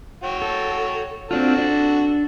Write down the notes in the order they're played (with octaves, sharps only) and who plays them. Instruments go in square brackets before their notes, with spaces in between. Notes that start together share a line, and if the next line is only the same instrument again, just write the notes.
[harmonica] F#4 C#5 G5
[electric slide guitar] A4
[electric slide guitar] C4 D4 F4 [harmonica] F#4 A4
[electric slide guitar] D4